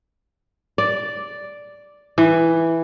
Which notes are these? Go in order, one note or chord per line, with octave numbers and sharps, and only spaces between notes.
D5
E3